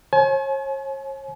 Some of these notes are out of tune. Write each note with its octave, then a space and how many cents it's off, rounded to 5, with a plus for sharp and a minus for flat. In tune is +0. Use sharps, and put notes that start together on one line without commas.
C#5 -40 G#5 +40